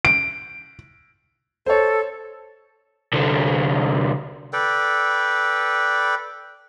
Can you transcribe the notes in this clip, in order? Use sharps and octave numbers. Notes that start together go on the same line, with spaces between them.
D7
A4 C5 C#5
C2 D3
A4 B4 D5 G5